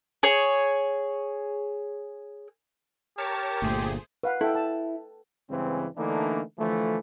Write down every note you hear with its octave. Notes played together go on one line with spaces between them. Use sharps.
G#4 C#5
G4 A#4 C#5 A5
G1 A#2 A3 G#4 C5
B4 F5 F#5
E4 A4 G5
A5
G2 C#3 E3 G#3 C4
D3 E3 A3 A#3 D4 D#4
D3 E3 F3 A3